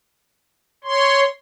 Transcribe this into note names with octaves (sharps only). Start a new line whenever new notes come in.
C#5 C6